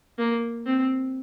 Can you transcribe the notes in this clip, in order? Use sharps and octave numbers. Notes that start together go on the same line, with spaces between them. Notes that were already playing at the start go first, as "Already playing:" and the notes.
A#3
C4